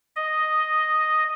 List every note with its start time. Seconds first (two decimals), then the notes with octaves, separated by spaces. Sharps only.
0.16 D#5